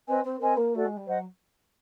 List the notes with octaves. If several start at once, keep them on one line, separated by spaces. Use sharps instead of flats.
C4 B4 D#5 G#5
C4
C4 A#4 D#5 G#5
A#3
A3 F#4 A4 D5
G#3
G3
F#3 C5 D#5 F#5